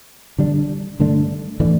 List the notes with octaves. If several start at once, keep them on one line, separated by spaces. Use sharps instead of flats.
D3 G3 D4
G2 D3 A3 D4
A2 E3 A3 D4